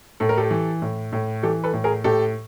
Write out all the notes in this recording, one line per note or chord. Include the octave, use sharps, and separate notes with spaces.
A2 A4
A#4
G4 A4
E3
A2
A2
E3 G4 A4
A4 B4
A2
G#4 A#4
A2 G4 A4